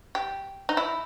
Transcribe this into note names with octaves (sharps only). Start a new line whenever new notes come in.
G4
D#4
E4